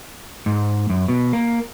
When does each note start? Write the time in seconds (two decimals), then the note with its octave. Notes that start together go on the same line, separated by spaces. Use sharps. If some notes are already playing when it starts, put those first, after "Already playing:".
0.46 G#2
0.90 F#2
1.08 B2
1.33 A#3